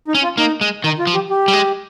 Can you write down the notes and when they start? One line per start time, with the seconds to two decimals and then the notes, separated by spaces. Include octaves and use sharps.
0.08 D#4
0.15 C#4
0.23 F4
0.38 A#3 D#4
0.61 G#3
0.84 D#3 D#4
0.99 F4
1.07 F3
1.14 G4
1.30 G4
1.48 G3
1.53 G#3